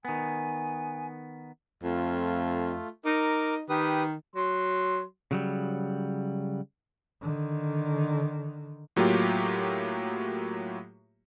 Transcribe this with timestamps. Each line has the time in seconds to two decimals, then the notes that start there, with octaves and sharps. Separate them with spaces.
0.05 D#3 B3 G#5
1.83 F2 A3 F4
3.05 D#4 A#4 D6
3.69 D#3 G4 B4 D#6
4.35 F#3 C6
5.31 C#3 F#3 G3
7.21 D3 D#3
8.96 A2 F#3 A#3 F4 G4